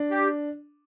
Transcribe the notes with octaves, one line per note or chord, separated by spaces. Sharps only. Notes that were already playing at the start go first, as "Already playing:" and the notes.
Already playing: D4
G4